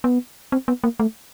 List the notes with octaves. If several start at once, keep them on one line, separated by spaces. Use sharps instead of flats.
B3
C4
B3
A#3
A3